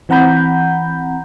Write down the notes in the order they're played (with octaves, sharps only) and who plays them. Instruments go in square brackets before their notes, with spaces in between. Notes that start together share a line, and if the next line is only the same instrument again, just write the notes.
[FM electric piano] E3 C4 F#5 A#5 B5 G6